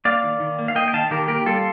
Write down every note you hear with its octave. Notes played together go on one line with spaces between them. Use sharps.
A#3 D5 F5
D#3
D#3
A#3
F5
A#3 D#5 G5
G5
D#3 F5 A5
D#3 G4 A#4
A#3 G4 A#4
G3 F4 A4